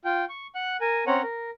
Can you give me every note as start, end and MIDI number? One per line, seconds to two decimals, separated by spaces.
0.05 0.25 65
0.05 0.25 79
0.29 0.47 85
0.55 0.77 78
0.55 0.77 90
0.81 1.05 70
0.81 1.05 80
1.07 1.22 60
1.07 1.22 61
1.07 1.22 73
1.07 1.22 78
1.07 1.22 82
1.23 1.51 70